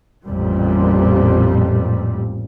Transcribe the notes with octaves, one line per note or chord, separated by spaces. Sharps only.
A1 F2 A#2 G3